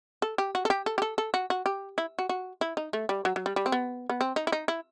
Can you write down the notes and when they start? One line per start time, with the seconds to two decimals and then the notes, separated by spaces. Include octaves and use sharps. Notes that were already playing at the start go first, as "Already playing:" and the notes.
0.22 A4
0.38 G4
0.55 F#4
0.65 A4
0.70 G4
0.86 A4
0.98 G4
1.02 A4
1.18 A4
1.34 F#4
1.50 F#4
1.66 G4
1.98 E4
2.19 F#4
2.29 F#4
2.61 E4
2.77 D#4
2.93 A3
3.09 G3
3.25 F#3
3.36 F#3
3.46 G3
3.56 G3
3.66 C4
3.72 B3
4.10 B3
4.21 C4
4.36 D#4
4.47 E4
4.52 D#4
4.68 E4